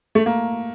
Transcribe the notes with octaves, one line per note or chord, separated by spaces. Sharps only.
A3
A#3